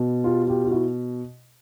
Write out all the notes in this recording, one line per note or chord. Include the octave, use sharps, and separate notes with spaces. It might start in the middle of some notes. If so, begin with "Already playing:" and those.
Already playing: B2
F4 G4
F4 G4
F4
E4 F#4